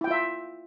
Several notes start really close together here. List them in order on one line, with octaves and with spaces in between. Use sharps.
E4 G5 F4 E5